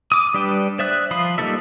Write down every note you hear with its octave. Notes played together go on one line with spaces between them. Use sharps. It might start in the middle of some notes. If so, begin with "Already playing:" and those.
D6 D#6
G3 D4 B4 G5
C5 D5 E5 D#6 F#6
F3 F5 B5 C6 D#6
G3 A#3 D#4 A4 E5